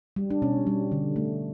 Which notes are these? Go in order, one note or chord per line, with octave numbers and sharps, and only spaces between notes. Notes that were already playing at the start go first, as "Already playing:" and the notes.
G3
D4
B2 C#4
G3
D3
A3